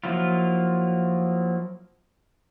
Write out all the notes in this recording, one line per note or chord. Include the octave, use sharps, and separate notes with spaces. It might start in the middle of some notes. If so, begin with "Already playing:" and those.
F3 F#3 A#3 E4 F4